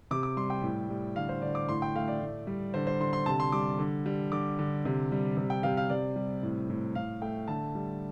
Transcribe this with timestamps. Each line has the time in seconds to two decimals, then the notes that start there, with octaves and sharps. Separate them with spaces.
0.11 C3 D6
0.23 D6
0.37 G3 C6
0.50 G5
0.63 A2
0.90 G3
1.16 D3 F5
1.29 C5
1.42 D3 D5
1.55 D6
1.69 A2 C6
1.82 G5
1.95 A3 F5
2.08 D5
2.21 A2
2.47 G3
2.74 D3 C5
2.87 C5
3.00 D3 C6
3.13 C6
3.26 C3 A5
3.40 C6
3.52 G3 D6
3.79 D3
4.06 G3
4.32 D3 D6
4.59 D3
4.85 C3
5.12 G3
5.37 C3
5.50 G5
5.63 C3 F5
5.77 F5
5.90 C3 D5
6.16 G3
6.43 A2
6.70 A2
6.95 A2 F5
7.21 A3 G5
7.48 D3 A5
7.75 G3